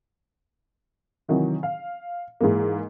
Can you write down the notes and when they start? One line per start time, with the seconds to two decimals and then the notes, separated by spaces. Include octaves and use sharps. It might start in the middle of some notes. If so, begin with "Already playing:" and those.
1.28 C3 D#3 E3 F#3
1.63 F5
2.41 G#2 E3 G#3 A#3